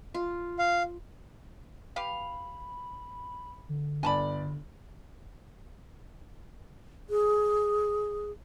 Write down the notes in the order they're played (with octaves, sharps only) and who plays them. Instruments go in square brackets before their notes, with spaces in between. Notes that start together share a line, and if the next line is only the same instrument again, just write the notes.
[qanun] F4
[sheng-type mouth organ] F5
[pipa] G4 B4 F5 [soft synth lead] B5
[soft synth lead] D3
[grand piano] G1 D5 [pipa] G#5 A5 B5
[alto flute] G#4